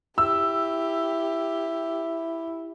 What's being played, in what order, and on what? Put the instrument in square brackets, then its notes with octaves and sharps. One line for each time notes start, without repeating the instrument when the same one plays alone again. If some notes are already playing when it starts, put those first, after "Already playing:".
[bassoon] E4 [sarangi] G4 [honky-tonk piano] E6